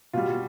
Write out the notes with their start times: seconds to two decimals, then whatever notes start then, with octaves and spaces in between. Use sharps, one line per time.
0.13 B2 G3 F4